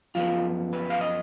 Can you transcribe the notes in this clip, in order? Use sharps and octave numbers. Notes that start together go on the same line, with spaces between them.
F#2 F3 B3 F4
B4
F5
D#5